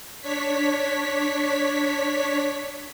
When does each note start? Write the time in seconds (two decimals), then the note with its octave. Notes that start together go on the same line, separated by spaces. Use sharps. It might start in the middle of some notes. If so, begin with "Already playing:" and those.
0.21 D4 C#5 B6